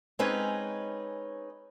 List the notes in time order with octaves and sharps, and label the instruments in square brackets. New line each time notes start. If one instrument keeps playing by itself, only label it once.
[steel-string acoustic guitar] G#3 C4 C#4 D#4 B4 C#5